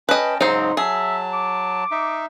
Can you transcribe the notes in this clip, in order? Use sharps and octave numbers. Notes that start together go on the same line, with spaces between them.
C#4 B4 D#5 G5 A5
G#2 C#3 F#3 C4 D#4 C5
F#3 G#4 E5 A5
D6
D#4 E5